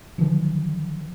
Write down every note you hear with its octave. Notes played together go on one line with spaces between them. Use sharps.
D3 D#3 F3 F#3